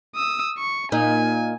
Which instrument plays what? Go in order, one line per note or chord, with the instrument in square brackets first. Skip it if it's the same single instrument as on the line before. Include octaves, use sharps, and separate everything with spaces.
[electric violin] D#6 E6
C#6
[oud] A#2 D#4 [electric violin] G#5